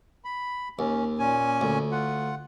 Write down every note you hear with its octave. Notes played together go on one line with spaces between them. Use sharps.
B5
D#2 C#4
A#2 C#4 G#5
D2
F4 F#5